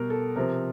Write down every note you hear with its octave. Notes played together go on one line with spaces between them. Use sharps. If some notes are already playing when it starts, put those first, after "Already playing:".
Already playing: B2 G3 A#4
A4
C3 F3 A#4